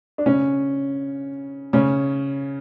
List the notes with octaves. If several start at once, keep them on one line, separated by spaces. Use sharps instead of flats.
D4
C#3 C#4
C#3 C#4